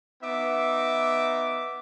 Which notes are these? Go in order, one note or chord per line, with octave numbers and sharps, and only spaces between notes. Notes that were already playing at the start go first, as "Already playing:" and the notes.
B3 D#4 E5 D6